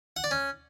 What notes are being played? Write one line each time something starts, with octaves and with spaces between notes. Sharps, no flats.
F#5
D5
C#4